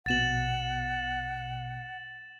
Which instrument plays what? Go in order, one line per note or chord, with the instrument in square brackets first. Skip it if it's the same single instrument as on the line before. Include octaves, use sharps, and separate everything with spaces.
[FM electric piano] A#1 B2 [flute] F#5 [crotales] A6 E7 F#7